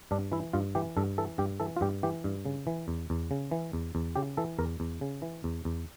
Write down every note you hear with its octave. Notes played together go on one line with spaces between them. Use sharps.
G2 D4
E3 E4
G2 F4
E3 G4
G2 A4
E3 A4
G2 G4
E3 A4
F4
G2 G4
E3 G4
G2
C#3
E3
E2
E2
C#3
E3
E2
E2
C#3 G4
E3 A4
E2 A#4
E2
C#3
E3
E2
E2